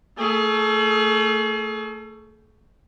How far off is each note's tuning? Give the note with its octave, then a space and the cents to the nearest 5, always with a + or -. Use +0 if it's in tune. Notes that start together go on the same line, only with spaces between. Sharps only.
A3 +25 G#4 +45